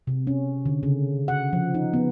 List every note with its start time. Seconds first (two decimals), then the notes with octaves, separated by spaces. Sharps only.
0.07 C3
0.27 C#4
0.66 D3
0.83 C#3
1.28 F#5
1.53 F3
1.74 D#4
1.93 B3